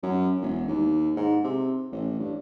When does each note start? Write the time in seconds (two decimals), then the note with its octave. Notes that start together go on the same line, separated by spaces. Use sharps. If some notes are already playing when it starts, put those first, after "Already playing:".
0.03 F#2
0.42 E1
0.68 D#2
1.16 G#2
1.44 C3
1.92 A1
2.19 G2